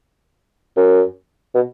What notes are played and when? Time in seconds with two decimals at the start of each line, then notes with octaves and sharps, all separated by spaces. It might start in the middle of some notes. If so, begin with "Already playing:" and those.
0.77 F#2
1.55 B2